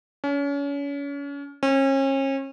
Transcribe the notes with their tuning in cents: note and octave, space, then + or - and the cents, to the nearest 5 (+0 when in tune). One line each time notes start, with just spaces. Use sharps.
C#4 +35
C#4 -35